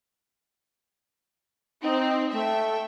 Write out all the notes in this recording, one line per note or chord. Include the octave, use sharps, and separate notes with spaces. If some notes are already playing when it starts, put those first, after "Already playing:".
C4 D#4
A3 E5 G5